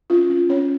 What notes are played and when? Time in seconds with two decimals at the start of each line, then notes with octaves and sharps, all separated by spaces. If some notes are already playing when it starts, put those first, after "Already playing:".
0.10 C#4 F4
0.30 C#4
0.50 C#4 C#5